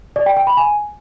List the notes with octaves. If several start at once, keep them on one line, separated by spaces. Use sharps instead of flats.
D5
G5
G5
B5
G#5